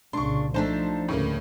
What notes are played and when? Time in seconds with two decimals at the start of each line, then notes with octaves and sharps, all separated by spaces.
0.13 C2 A#2 C#3 D4 C6 C#6
0.54 F3 A3 D4 D#4 C5 A5
1.08 D2 A2 C#3 A#3